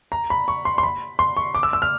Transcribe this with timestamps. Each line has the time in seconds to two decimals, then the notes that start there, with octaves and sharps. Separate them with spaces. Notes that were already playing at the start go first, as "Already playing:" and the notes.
0.12 A#5
0.30 B5
0.48 C#6
0.65 C6
0.78 C6
0.83 B5
1.19 C6
1.37 C#6
1.55 D6
1.63 E6
1.73 E6
1.82 F6